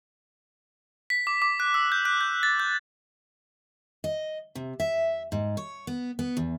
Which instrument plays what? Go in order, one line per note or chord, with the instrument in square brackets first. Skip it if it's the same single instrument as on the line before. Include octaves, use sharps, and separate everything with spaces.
[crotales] B6
D6
D6
F#6
E6
G6
F#6
G6
A6
G6
[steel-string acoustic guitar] D#5
C3
E5
G#2
C#5
B3
B3
E2